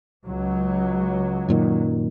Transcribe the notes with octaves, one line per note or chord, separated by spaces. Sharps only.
C#2 F#3
F#2 A#2 D#3